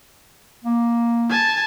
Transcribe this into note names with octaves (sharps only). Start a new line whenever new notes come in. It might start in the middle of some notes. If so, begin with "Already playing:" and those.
A#3
G#5 A5